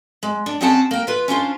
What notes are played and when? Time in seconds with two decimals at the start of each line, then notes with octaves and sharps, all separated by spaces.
0.23 G#3
0.46 D4
0.61 C4 C#4 G#4 F#5 G5 A5
0.91 A#3 G5
1.07 F4 B4
1.28 C#4 D4 F4 C5